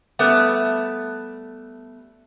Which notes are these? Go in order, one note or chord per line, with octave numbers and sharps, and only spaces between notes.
G3 A3 B3